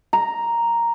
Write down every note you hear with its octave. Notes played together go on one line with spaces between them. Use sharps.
A#5